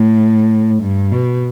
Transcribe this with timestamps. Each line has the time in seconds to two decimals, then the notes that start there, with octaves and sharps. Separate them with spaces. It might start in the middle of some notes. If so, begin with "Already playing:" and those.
Already playing: A2
0.82 G2
1.12 B2